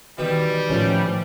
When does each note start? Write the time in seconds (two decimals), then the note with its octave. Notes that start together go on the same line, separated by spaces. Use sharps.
0.18 B2 D#3 E3 G3
0.70 A2 F3 C#4